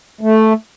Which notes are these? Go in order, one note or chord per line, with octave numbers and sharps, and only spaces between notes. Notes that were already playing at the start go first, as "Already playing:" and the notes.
A3